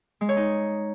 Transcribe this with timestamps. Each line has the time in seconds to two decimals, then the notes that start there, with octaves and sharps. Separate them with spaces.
0.21 G#3
0.29 C#5
0.37 D#4